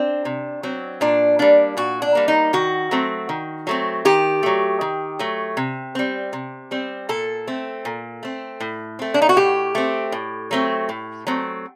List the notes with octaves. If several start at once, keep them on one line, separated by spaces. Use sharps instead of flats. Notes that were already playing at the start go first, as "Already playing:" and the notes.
Already playing: C4 D4
C3
F#3 C4
A#2 D4
G3 A#3 D4
A#2 F#4
D4
G3 A#3
D#4
D#3 F#4
F#3 A3 C4
D#3
F#3 A3 C4
D#3 G4
F#3 A3
D#3
F#3 A3
C3
G3 C4
C3
G3 C4
A#2 A4
A3 C4
A#2
A3 C4
A2
A3 C4
D4
D#4
F#4
A2 G4
A3 C4
A2
F#3 A3 C4
A2
F#3 A3 C4